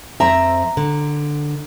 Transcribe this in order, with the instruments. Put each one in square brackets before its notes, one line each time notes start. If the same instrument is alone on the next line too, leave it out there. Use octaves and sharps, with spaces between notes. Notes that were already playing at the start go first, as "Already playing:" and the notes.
[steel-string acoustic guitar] F2 C4 E5 [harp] A#5
[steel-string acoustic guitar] D3